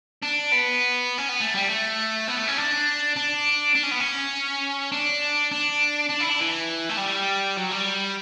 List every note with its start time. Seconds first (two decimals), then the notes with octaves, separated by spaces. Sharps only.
0.22 D4
0.52 B3
1.18 C#4
1.29 B3
1.40 A3
1.55 G3
1.69 A3
2.28 B3
2.37 A3
2.47 C#4
2.57 D4
3.16 D4
3.75 D4
3.83 C#4
3.91 B3
4.00 C#4
4.92 D4
5.52 D4
6.09 D4
6.20 E4
6.29 D4
6.40 E3
6.89 A3
6.97 G3
7.57 F#3
7.71 G3